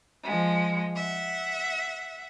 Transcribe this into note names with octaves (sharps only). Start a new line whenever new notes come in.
F3 G#3
E5 F#5